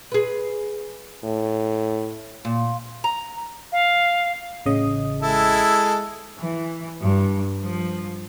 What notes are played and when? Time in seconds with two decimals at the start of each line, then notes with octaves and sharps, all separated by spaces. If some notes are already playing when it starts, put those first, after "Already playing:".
0.12 G#4 B4
1.24 A2
2.45 A#2
3.04 A#5
3.72 F5
4.66 A1 C#3 D#5
5.22 G#3 E4 A4
6.39 E3
7.02 G2
7.61 F3